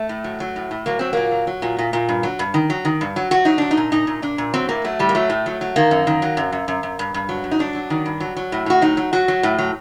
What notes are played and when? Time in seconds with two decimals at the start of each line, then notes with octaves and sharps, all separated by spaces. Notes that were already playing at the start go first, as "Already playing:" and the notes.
Already playing: A3
0.09 A2
0.24 F#3
0.40 F#3
0.56 A2
0.71 A2
0.86 F#3 A#3
0.99 F#3 C4
1.13 A#2 A#3
1.31 F#3
1.47 F#3
1.62 A#2
1.78 A#2
1.93 A#2
2.09 G2
2.23 F#3
2.39 G2
2.54 D#3
2.70 F#3
2.85 D#3
3.01 G2
3.16 F#3
3.31 F#3 F#4
3.45 F#3 D#4
3.58 F#3 D4
3.71 D#4
3.77 A#2
3.92 A#2 D#4
4.07 A#2
4.22 A#2 D4
4.38 A#2
4.54 F#3 C4
4.69 A2 A#3
4.84 F#3 A3
4.99 A2 G3
5.09 A#3
5.15 F#3 A3
5.30 A2
5.46 F#3
5.61 F#3
5.76 D#3 A#3
5.91 F#2
6.07 D#3
6.22 F#3
6.37 F#2
6.52 F#2
6.68 F#2
6.83 F#2
6.99 G2
7.14 G2
7.29 F#3
7.44 G2
7.51 D#4
7.59 F#3 D4
7.75 F#3
7.90 D#3
8.06 G2
8.20 F#3
8.36 F#3
8.52 A2
8.66 A2 F#4
8.82 F#3 D#4
8.97 F#3
9.13 F#3 F#4
9.28 F#3
9.43 A2
9.58 F#3